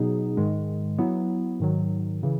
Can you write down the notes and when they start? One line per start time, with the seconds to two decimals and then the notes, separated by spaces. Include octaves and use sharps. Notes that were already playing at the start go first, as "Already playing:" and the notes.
Already playing: B2 F#3 B3 D#4 G#4
0.37 G#2 D#3 G#3
0.98 F#3 B3 E4
1.60 G#2 D#3 F#3
2.23 C#3 E3